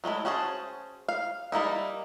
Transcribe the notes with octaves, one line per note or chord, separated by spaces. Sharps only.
F#3 G#3 A3 E4
C#4 F#4 G#4 C5 A5
F5
G3 A#3 D#4 E4